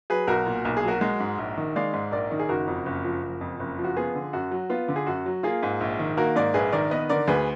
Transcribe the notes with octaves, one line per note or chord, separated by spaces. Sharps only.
F#3 G#4 B4
B1 F#4 A#4
A#2
B1 A#4
G#4
F#3 F#4 A#4
G#3
G#2
A#1
D#3
G#3 D5 F5
G#2
A#1 A#4 D5
D#3
G#4
F#1 F#4 A#4
F2
F#1
F3
F#1
F2
F#1
F3
F#4
B3 F4 G#4
D3
F#2 F#4
F#3
B3 F4
D3
G#4
F#2 F#4
F#3
A#3 F4 G#4
G#2
A#1
D#3
A#3 F#4 A#4
G#2 A#4 D5
A#1 G#4 B4
D#3 A#4 D5
B3 B4 D#5
D3 A#4 D5
D2 G#4 B4